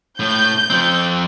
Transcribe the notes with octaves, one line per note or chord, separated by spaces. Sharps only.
A2 G6
F3 C4